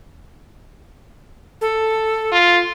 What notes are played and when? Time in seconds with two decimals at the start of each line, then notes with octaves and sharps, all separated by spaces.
1.61 A4
2.32 F4